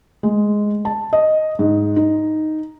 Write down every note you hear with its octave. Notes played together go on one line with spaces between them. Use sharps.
G#3
A5
D#5
G#2
D#4